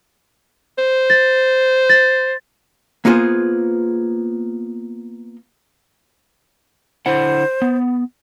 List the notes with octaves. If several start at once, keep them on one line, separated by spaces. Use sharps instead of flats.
C5
A6
A6
A#3 B3 F4 G#4 C5
D3 E4 C5 F#5
B3